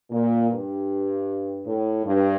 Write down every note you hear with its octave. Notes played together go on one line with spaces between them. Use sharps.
A#2
G2
A2
G2